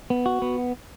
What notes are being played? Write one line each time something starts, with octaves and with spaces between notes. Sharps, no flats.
B3
F#4
B3